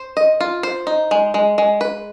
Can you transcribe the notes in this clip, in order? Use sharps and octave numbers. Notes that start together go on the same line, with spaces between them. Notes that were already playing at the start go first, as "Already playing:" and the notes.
Already playing: C5
D#5
F4
C5
D#4
G#3
G#3
G#3
B4